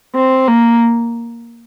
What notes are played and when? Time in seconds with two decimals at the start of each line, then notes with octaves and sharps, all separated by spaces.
0.15 C4
0.47 A#3